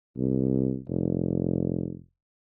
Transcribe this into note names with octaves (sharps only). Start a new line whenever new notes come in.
C2
F1